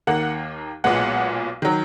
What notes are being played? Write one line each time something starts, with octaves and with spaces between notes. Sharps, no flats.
D#2 D#3 A#3 F#5
B1 A#2 G#3 B3 F#5
D#3 F#3